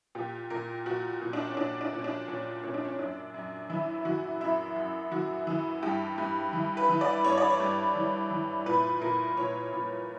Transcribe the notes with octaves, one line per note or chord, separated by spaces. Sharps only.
A#2 G4
A#2 A#4
A#2 F#4
A#2
D4
C#4
A#2 D4
D4
A#2 C#4
D4
A#2 C#4
A#2 C#4
D4
C#4
F#2 D4
F#2
E3 E4
E3 F#4
F#2 E4
F#2
E3 F#4
E3
G2 G4
G2
E3
B4
E3
D5
G2 C#5
D5
C#5
G2
E3
E3
A#2 B4
A#2 A#4
A#2 C#5
A#2